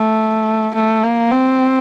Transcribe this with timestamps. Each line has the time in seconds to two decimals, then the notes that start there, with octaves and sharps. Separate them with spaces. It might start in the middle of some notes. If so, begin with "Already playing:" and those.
Already playing: A3
0.75 A3
1.03 A#3
1.31 C4